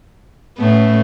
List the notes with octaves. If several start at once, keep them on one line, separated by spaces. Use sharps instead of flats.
A2 A3 B3 C#4